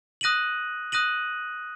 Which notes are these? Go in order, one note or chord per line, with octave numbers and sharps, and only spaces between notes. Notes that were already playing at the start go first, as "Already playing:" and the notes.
D#6 F#6 A#6 D#7 F#7
D#6 F#6 A#6 D#7 F#7